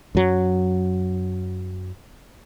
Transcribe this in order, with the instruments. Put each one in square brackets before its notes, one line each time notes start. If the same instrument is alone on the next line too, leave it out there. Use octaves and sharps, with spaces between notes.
[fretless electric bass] F#2 F#3